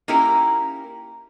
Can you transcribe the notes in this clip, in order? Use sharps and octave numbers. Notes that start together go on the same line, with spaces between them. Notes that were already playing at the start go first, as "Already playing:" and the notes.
A#3 C#4 D#4 E4 G4 A#4